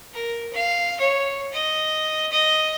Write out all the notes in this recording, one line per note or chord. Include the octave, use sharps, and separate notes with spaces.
A#4
F5
C#5
D#5
D#5